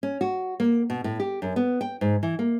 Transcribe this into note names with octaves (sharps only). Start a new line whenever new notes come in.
C#4
F#4
A#3
B2
A2
G4
F#2
B3
G5
G#2
E3
A#3